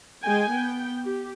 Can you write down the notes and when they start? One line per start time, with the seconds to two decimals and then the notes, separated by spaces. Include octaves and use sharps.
0.23 G#3 G5 G#5
0.51 B3 G5
1.04 G4